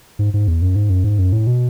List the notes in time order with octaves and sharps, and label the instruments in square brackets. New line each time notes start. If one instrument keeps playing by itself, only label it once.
[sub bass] G#2
G#2
E2
F#2
G#2
F#2
G#2
F#2
A2
B2